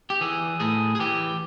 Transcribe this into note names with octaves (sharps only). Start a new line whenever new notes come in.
G4
E3 G#4
A2 G#4
G#4
E3 G4